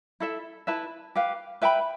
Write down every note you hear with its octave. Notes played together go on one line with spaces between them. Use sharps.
E4 A4 E5
E4 B4 E5 A5
G4 B4 F5
B4 E5 G5 B5